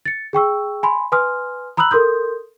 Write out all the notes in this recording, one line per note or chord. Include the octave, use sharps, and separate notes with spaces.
A6 C#7
G#4 G5 C#6 E6
G#5 B5 C6
B4 G#5 C6 D#6 F6
A#5 B5 D#6 E6 F#6 F#7
A4 A#4 C6 D#6 G6